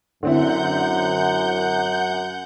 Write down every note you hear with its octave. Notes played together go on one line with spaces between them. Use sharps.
F#2 D3 C4 E4 F#5 G6